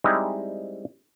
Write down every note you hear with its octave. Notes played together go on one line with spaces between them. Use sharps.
G3 G#3 C4 D#4 E4